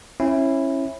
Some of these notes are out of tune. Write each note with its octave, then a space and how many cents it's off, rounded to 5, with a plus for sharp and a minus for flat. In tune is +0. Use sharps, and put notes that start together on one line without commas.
C#4 -30 E4 +0